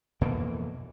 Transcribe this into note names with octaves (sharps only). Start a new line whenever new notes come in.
F2 B2 E3 A#3